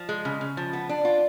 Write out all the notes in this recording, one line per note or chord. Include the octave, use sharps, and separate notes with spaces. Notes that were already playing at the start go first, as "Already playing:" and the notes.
Already playing: F3
G#3
C#3
C#3
F3
B3
D4
F4